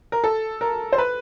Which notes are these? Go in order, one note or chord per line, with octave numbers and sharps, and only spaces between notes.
A#4
A4
A#4
C5
B4